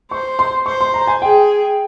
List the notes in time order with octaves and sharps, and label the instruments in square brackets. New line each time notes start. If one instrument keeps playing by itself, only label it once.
[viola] C5 [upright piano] C#6
[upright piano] C6
[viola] C5 [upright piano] C#6
[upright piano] C6
A#5
G#5
[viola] G#4 [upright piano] G5